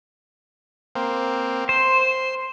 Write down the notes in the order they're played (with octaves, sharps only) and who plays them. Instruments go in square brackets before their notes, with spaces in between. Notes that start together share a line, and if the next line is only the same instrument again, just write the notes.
[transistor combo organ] A#3 C4
[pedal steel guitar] C5 [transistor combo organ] C6